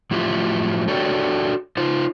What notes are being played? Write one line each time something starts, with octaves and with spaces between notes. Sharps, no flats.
A2 F3 F#3 E4 F4 G4
D4 F#4 G4 A4 C#5
D#4 F4 C5